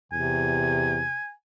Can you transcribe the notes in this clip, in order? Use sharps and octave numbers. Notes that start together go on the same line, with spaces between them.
E2 C3 G#5